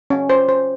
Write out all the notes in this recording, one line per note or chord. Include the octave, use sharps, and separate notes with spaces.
C#4
C5
C5